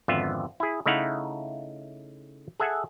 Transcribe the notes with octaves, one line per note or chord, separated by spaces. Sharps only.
G#1 F2 D3 B3 F4 E5
E4 G#4
C#3 A3 D#4 E4 F5 F#5
G#4 A4 E5 F#5 G#5